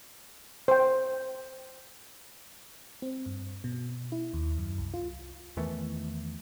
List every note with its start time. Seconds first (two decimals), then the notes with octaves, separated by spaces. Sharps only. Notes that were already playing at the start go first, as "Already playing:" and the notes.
0.68 C5 G5
3.02 C4
3.26 G2
3.64 B2
4.12 E4
4.33 D#2
4.58 F#2
4.78 C2
4.94 F4
5.57 E2 D#3 E3 A3